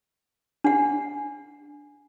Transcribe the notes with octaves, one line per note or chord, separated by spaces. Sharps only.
D4 F#5